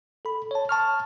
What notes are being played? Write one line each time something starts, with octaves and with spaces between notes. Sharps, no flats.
A4 B5
C#5 A5
A5 C#6 F6